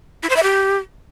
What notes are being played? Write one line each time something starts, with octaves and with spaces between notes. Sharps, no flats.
E4
C5
E5
G4